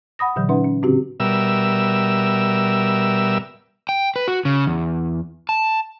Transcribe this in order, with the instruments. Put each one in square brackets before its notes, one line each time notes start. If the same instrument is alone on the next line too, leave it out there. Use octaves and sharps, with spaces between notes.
[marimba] F#5 B5 D#6 A#6
A#2 D3 E3 F#3
C#4 D#4 B4 E5 F#5 C6
C#4
A2 C#3 C4 D4 F#4 G4
[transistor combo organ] B2 G3 A#4 E5 E6
[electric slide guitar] G5
B4
F#4
C#3
E2
A5